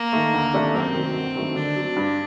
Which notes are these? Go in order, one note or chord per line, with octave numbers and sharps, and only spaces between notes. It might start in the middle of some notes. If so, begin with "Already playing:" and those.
Already playing: A#3
D#3 A3
D2
C3 D#3 A3 D4
F#2 C4
D#3 F#3
G1
G2 D#3 F#3 A3
D3 D4
F#3 C4
G2